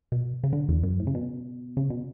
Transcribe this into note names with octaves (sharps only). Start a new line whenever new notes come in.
B2
C#3
D3
E2
F#2
A2
C#3
B2
C#3
B2